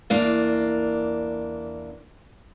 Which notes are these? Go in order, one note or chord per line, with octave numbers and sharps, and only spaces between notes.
E2 A#3 D4